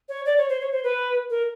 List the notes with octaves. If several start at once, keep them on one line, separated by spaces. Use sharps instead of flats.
C#5
D5
C#5
C5
C#5
C5
B4
A#4